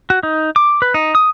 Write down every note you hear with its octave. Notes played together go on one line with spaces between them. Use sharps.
F#4
D#4
D6
B4
D#4
D#6